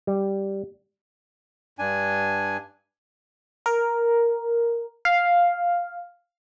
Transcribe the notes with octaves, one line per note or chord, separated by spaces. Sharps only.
G3
G2 D4 G#5
A#4
F5